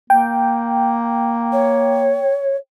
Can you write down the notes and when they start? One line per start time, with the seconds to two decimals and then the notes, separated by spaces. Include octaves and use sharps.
0.10 A#3 G5
1.52 C#5